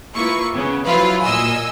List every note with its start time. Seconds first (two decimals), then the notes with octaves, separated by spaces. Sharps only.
0.15 A#3 E4 F4 B4 C#6
0.55 C#3 B3 C#4
0.86 F3 F#3 E4 F4 B4 F5
1.25 A#2 D#5 G#5 E6